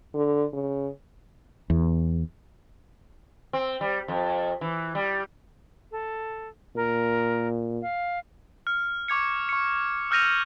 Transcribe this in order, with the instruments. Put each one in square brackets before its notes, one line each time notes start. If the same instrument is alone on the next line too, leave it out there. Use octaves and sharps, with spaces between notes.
[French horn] D3
C#3
[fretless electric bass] E2
[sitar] C4
G3
F2
E3
G3
[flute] A4
[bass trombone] A#2 [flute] A#4
[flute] F5
[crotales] F6
C#6 D6 G#6 C#7
C#6 C#7
E6 F6 G6 A#6 D#7 F7